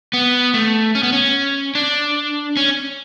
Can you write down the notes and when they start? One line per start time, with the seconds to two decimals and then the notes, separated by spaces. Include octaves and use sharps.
0.13 B3
0.54 A3
0.95 C#4
1.03 B3
1.12 C#4
1.75 D4
2.57 C#4